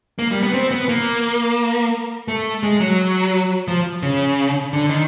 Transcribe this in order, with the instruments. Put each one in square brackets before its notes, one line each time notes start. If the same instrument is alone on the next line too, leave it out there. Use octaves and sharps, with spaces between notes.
[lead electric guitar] A#3
G3
B3
C4
B3
A#3
A3
G#3
F#3
F3
C#3
D3
D#3